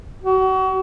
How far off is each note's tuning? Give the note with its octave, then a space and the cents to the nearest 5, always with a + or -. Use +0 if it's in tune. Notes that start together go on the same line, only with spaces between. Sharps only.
F#4 +35